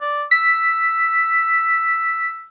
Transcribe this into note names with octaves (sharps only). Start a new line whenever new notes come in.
D5
E6 B6